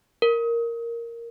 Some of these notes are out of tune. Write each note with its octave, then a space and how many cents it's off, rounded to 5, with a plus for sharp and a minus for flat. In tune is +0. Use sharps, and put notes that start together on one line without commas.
A#4 +0